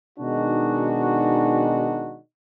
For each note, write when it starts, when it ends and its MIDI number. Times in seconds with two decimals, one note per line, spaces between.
0.18 2.18 47
0.18 2.18 51
0.18 2.18 56
0.18 2.18 62
0.18 2.18 63
0.18 2.18 66